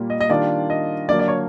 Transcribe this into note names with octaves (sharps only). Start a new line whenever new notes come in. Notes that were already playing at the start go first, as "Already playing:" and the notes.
Already playing: A#2 G3 A#3
D#5
D#5
D#3 G3 A#3 D4 F4 D5
D#5
D3 F#3 A#3 D4 D5
D5
C#5